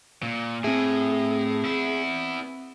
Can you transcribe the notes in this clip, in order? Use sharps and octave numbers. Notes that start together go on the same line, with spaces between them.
A#2
A2 C4 G#4 E5
B3 E4